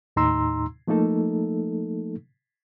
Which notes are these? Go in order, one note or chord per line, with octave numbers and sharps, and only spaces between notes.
D#2 A2 D#4 A#5 C6 E6
F3 A3 A#3 D#4 A4